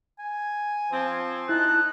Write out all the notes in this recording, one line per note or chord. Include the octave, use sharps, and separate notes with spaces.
G#5
F3 C4
D#4 E4 A5 F#6